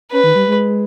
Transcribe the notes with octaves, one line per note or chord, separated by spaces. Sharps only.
C#4 B4
D#3
G3
G#3